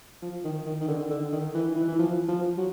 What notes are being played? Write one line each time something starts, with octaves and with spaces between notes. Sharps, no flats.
F3
D#3
D#3
D#3
D3
D3
D#3
E3
E3
E3
F3
F3
F#3